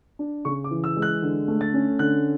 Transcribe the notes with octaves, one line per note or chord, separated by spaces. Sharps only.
D4
C#3 C#6
D6
E3
E6
G#3
F#6
D3
A3
A6
C#4
D3 F#6